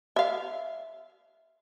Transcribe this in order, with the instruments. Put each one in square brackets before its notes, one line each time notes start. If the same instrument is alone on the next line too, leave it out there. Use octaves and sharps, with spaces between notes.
[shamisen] E5 F5